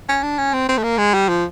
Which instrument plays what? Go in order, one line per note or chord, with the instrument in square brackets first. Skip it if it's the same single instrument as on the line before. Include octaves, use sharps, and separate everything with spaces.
[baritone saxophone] C#4
D4
C#4
C4
C4
A3
A#3
G#3
G3
F3